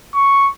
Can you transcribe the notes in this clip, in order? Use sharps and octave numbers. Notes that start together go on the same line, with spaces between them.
C#6